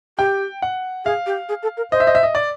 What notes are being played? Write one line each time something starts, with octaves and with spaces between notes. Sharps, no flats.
G4 G5
F#5
G#4 F5
G4
G#4
A4
A#4
C5 D#5
E5
D#5
E5
D#5
D5